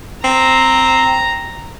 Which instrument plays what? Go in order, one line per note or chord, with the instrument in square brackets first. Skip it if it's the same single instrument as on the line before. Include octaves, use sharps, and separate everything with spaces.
[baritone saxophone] C4 [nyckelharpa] A#5